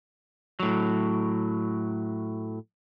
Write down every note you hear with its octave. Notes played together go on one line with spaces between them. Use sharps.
A2 F#3